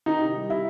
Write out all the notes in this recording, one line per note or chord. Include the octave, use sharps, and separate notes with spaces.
D#3 D#4
C3
G3
C3 E4